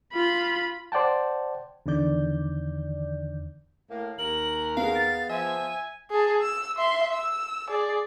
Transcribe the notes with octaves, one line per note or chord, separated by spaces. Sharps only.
F4 B5
C5 D5 F#5 G5 A5
E2 D3 D#3 D5 G6
A2 A#3
D#2 A#4 F#7
B3 G#4 F5
A6
F3 E5 G#5
G#4 A5
E6
E5 C6
E6
G#4 D5